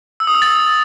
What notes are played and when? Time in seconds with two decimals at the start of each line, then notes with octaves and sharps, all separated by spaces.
0.20 E6
0.27 D#6
0.35 E6
0.42 A6